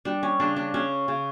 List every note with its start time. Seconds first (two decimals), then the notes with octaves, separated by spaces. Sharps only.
0.05 G3 D4
0.23 C#4
0.40 C#3 D4
0.57 D4
0.74 C#3 C#4
1.08 C#3